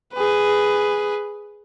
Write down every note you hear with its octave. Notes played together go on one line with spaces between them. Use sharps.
G#4 B4